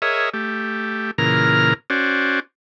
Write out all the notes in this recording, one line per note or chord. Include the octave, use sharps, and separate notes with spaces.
G#4 A#4 C#5 D#5 E5
A3 G4
A#2 C#3 E3 A#4 A#5 F6
C#4 F#4 C5 D5